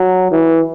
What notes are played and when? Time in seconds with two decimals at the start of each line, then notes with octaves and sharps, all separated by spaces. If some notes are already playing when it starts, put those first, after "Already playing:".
Already playing: F#3
0.31 E3